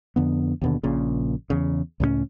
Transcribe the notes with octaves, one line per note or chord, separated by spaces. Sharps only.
F2 D3 B3
D#2 B2 D3
A#1 A#2 C#3
E2 C#3
C#2 A2 G3 C#4